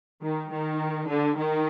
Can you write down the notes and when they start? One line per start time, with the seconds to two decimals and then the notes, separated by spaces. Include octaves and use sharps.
0.23 D#3
0.52 D#3
1.09 D3
1.37 D#3